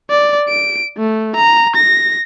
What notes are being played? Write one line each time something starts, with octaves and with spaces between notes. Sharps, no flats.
D5
D7
A3
A#5
A#6